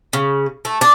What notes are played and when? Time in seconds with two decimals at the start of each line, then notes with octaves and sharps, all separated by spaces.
0.13 C#3
0.65 A3
0.81 D4